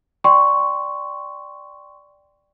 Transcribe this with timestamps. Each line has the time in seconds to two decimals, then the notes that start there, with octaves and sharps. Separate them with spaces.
0.24 D5 G5 C6 C#6